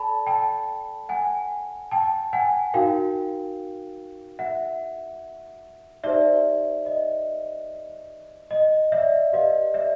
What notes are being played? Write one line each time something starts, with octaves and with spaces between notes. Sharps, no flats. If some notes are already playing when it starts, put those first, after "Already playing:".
Already playing: A4 D5 A5 B5
G5 A5
F#5 G#5
G5 A5
F#5 G#5
D#4 F#4 A#4 F5 G5
E5 F#5
D#4 G4 C5 D5 E5
D#5
D#5
D5 E5
G4 B4 D5 D#5 F5
D5 E5